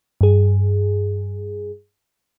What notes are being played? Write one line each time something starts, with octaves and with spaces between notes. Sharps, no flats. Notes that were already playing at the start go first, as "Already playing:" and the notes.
G2 G#4